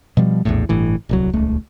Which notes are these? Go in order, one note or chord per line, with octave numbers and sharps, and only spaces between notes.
B2 F3 G3
A#1 E2 A2
G1 A2 E3
D1 C2 F#3
D#1 C#2 A3